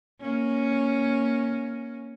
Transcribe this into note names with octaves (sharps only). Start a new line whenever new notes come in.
A#3 C#4